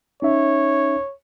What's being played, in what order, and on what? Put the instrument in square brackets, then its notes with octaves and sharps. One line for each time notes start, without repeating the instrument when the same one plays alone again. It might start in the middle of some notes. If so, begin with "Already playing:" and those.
[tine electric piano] C#4 D#4 E5 [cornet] C#5